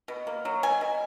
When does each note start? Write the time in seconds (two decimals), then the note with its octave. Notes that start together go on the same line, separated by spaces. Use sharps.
0.08 B2
0.27 A#3
0.45 F#3
0.63 B2 G#5
0.81 B2